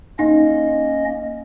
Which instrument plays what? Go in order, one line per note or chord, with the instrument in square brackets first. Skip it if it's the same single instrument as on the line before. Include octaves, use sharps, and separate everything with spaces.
[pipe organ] A#3 C#4 D#5 [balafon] D#4